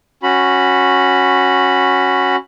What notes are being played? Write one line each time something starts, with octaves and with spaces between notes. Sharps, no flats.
C#4 F#4 B5